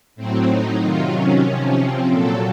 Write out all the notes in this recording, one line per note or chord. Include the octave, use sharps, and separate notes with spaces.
A2 F#3 C4
D#4
C3 D#3 F#3 F4
C#4
C3 F3
C4
A#2 F#3 A4